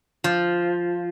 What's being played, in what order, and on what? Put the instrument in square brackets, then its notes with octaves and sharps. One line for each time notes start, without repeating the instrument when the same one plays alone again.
[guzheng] F3